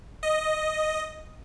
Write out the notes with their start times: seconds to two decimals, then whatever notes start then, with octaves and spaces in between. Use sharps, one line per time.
0.23 D#5